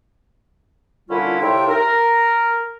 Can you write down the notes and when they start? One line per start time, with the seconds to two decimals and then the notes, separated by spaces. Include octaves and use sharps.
1.09 A#2 D3 G3 C#4 E4 F4
1.40 A2 C3 D#4 F4 E5 G5
1.68 A#4